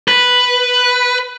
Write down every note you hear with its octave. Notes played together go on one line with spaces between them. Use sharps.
B4